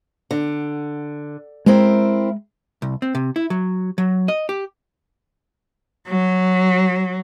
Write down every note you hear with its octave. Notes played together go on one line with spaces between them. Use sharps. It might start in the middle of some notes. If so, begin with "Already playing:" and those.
D3
G#3 C4 E4 A#4
C2
C4
C3
E4
F#3
F#3
D#5
G4
F#3